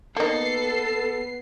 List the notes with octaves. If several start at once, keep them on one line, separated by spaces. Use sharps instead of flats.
A#3 B3 D#4 A4 C7